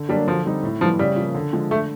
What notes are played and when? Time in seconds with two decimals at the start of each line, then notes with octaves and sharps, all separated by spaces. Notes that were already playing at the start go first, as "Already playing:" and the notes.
Already playing: D3
0.09 F#3 G3 A#3 D4
0.28 D3 F3
0.45 G3 C4 D#4
0.63 A2
0.81 E3 F3 G3 B3
0.99 C#3 G3
1.16 F3 A#3
1.34 D3
1.53 F3 G#3
1.71 D3 A3